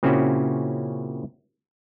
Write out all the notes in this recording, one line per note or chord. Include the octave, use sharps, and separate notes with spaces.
A#2 C#3 C4 C#4 E4 F#4